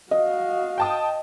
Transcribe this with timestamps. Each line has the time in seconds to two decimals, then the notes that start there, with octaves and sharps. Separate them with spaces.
0.11 F#4 D#5 F5
0.78 G5 A5 D#6